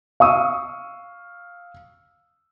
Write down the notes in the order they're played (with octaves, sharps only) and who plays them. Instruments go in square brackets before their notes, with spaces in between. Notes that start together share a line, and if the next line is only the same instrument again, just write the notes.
[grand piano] F5 C#6 D#6 E6